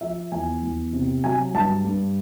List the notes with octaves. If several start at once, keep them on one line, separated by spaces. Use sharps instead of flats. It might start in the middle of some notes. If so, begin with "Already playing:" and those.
F3 E5
E2 G#5
E2
C3
F#3 G#5
G2 A5
G2